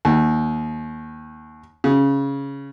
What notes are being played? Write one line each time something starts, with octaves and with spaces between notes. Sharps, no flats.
D#2
C#3